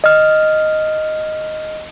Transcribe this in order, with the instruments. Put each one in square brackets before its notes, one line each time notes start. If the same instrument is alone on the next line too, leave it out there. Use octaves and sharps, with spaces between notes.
[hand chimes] D#5 F6